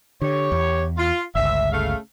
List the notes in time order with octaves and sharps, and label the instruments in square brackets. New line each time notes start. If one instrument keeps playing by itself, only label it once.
[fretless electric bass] D3 [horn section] G4 C#5
[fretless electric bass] E2
[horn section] F4
[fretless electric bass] G1 C#2 [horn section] E5
[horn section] C#3 A3 F5